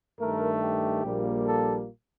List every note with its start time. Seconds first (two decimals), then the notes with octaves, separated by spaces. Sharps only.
0.19 G2 D#3 A3 A#4
0.61 G4
1.04 A#1 A#2 G3 A#3
1.47 A4